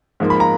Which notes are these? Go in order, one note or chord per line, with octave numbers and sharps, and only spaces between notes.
G#2 F3 A#3
B5
A#5